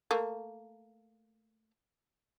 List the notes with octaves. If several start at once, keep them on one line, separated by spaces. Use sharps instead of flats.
A3 A#3